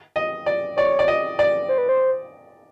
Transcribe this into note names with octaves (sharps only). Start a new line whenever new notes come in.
D#5
D5
C#5 D5
D5
D#5
D5
C5
B4
C5